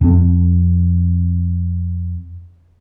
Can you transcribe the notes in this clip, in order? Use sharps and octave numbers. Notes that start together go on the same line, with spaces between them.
F2 C4